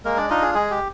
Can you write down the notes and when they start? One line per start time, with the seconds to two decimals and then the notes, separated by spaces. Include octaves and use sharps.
0.05 G#3 A#3 A#4
0.17 D4 D5
0.30 D4 D#4 F4 D#5
0.42 G#4
0.54 G#3 G#4
0.71 G4